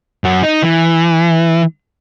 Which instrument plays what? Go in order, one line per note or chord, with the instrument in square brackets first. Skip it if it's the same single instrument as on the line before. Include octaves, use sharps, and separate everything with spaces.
[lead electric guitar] F#2 F#4
D#4
E3